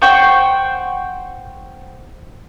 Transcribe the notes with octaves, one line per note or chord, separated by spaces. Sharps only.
C5 F#5 G5 C#6